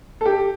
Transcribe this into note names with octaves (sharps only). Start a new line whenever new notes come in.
A4
G4